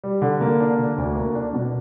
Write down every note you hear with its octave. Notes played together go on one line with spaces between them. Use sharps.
G3
D3
A#3
D4
D3
D2
A#3
D4
B2